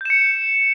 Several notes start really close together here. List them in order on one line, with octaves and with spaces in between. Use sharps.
G6 E7 C#7